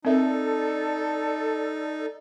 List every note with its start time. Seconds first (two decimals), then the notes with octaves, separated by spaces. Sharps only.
0.05 C4 D#4 A4 A#4 D5 E5